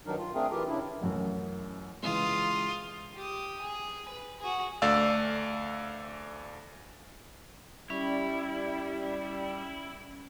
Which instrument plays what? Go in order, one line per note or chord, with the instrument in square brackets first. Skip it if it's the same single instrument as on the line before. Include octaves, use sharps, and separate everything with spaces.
[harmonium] G2 D#3 F#3 D4 D#4 A#4
F4
A3 C4 D4 F4 G#4 A#4
E3 F4 G4 A#4
C#3 D4 E4
[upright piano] A1 F#2
[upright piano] C#3 E3 G#3 [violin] F4 D#6
[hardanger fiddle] G4 D#6
G#4
B4
F#4 G#4
[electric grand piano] D2 A3 D5 F5 E6
[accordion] G3 [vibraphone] C#4 [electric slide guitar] E4